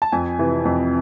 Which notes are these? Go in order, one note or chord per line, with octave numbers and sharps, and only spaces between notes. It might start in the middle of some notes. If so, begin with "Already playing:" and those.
A5
F2 G#5
C3 E3
F2